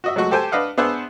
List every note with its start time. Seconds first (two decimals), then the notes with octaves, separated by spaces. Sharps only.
0.04 F#4 D#5 E5
0.16 F#3 G#3 A3 F#4 C#6
0.31 G4 A4 C5 G5 G#5
0.52 D4 B4 D#5 F5 F#5
0.78 B3 D4 G#4 C5 E5 F#5